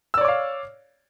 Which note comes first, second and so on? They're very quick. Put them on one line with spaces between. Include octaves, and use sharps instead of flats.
E6 D5 C#5 D6 F5